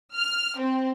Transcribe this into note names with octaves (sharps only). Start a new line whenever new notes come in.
F6
C4